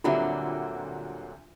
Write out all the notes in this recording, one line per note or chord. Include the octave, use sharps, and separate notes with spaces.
D2 A#2 D3 F#3 G3 C4 F4 E5